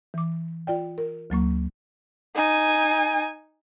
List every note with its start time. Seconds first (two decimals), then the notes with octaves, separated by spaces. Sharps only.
0.14 E3 D6
0.67 F4 D5 G5
0.98 A#4
1.30 D2 F#3 A#3 C#6
2.35 D#4 G#5